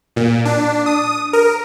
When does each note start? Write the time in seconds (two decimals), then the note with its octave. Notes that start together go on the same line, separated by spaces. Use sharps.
0.16 A#2
0.45 D4
0.86 D#6
1.33 A#4